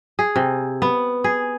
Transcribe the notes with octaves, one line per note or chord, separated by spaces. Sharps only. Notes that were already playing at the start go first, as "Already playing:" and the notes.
G#4
C3
B3
G#4